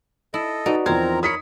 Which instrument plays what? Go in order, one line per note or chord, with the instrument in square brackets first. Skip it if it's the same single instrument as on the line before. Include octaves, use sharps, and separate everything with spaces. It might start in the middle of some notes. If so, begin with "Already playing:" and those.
[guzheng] E4 [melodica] A4 D#5
[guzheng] D#4 D5 [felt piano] F#4 B4
[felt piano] E2 F3 G#6 [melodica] C4 A#4 A#5 [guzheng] C5
[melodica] A#4 C#5 B5 [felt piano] D#6 B6 C#7